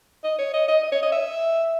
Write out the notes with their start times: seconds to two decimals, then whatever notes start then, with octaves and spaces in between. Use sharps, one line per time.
0.24 D#5
0.39 C#5
0.54 D#5
0.68 D#5
0.83 D#5
0.92 C#5
1.03 D#5
1.12 E5